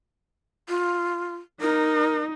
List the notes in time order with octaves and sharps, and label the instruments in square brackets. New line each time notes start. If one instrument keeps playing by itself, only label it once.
[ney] F4
[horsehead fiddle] D#4 [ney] A#4